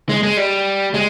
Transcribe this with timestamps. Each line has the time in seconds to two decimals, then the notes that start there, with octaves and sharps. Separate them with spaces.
0.09 G#3
0.23 G#3
0.37 G3
0.94 G#3